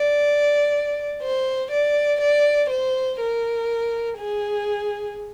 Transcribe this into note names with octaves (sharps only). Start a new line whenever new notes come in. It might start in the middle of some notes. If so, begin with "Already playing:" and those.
Already playing: D5
C5
D5
D5
C5
A#4
G#4